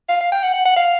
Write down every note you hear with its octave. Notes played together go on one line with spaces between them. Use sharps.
F5
F5
G5
F#5
F#5
F#5
F5